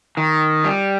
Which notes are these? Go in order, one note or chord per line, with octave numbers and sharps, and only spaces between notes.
D#3
G3